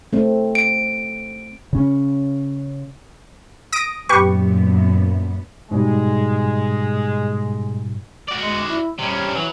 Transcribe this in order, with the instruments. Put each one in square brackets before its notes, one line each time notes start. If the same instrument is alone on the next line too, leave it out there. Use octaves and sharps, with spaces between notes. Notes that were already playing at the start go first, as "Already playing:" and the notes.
[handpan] A3 C4
[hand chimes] D7
[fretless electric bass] C#3 C#4
[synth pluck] D#6 A#6 D7
[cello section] F#2 A#2 B3 [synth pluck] G4 B4 C#6
[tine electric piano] G#2 B2 G3 [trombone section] G#3
[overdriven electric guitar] F#4 D5
[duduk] G#3
E4
[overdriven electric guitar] C3 C#4 [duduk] G3
[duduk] E3 [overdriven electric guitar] F#3